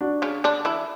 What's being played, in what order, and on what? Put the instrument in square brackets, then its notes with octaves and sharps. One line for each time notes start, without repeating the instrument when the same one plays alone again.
[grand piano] D4 F#4
[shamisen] C#3 C#4
D3 D4
E3 E4